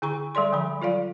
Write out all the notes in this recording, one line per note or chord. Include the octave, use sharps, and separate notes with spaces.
D3 E4 G#4 A#5 C#6
G3 A4 D5 C6
D3 F3 G3 B5
F#3 F4 A4 D5 F5